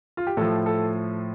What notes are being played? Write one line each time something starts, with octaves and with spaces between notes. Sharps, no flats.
F4
G4
A2 F3 A4
A4